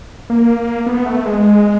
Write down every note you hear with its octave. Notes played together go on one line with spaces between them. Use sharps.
A#3
B3
A3
G#3